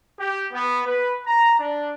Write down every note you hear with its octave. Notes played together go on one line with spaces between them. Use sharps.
G4
B3
B4
A#5
D4